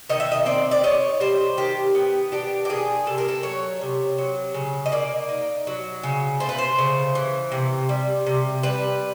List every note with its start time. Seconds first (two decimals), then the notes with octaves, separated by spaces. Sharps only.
0.10 D#3 D#5
0.20 E5
0.32 D#5
0.46 C4 D5
0.71 D5
0.84 D#4 C#5
1.20 G3 C5
1.58 D#3 G4
1.95 B3
2.32 D4 G4
2.65 G4
2.69 D#3 G#4
3.06 C3 A4
3.18 A#4
3.28 A4
3.43 F#3 C#5
3.81 C3
4.18 F#3
4.54 C#3
4.86 D#5
4.92 A#3 D5
5.29 D#4
5.67 F#3
6.03 C#3
6.40 A3 C5
6.49 B4
6.58 C5
6.78 C#3
7.15 E3
7.52 C3
7.89 G3
8.26 C3
8.63 G3 B4